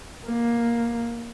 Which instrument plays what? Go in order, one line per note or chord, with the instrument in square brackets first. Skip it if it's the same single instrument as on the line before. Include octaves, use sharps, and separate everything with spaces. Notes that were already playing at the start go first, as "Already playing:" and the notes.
[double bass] A#3